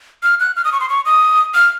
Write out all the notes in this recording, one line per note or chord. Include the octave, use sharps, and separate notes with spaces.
F6
F#6
F6
D#6
C#6
C6
C#6
D#6
F6